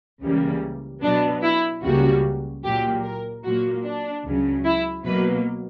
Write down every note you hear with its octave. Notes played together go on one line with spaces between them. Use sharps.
C#2 C#3 E3 G3 A#3
B2 F#3 B3 D4
E4
C#2 C#3 G3 A#3 F#4
A#2 F#3 A#3 G4
A#4
A#2 F#3 A#3 F#4
D4
C#2 C#3 F#3
E4
B2 F#3 A#3 B4